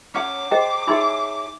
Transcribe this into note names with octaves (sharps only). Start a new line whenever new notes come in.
C#4 C#5 F#5 D6
G#4 C5 D#5 G5
D#4 E4 G#4 C#5 B5 C6